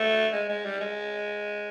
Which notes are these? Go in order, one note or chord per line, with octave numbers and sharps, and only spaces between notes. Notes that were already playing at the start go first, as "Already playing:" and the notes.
Already playing: A3
G#3
G#3
G3
G#3